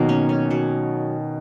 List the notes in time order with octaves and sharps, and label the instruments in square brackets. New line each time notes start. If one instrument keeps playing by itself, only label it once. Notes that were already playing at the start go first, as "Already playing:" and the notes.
Already playing: [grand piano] B2 D#3 [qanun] F#3 A#3
[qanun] C#4
C#4
F#3